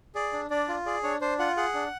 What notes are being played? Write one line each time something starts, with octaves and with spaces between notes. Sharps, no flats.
G#4 D5
D4
D4 D5
F4
G#4 D5
D4 C#5
D4 C5
F4 F#5
G#4 F#5
D4